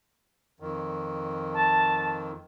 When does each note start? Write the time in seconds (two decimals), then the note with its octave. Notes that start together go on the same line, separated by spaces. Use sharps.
0.60 F2 D#3
1.54 A5